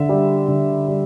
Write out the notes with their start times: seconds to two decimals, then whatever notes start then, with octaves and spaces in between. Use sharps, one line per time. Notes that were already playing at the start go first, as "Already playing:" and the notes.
Already playing: D3 E5
0.09 G3
0.48 D3
0.88 G3